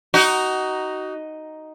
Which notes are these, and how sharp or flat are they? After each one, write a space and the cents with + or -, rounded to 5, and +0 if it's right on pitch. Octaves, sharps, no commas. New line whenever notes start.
D#4 +0 F#4 +25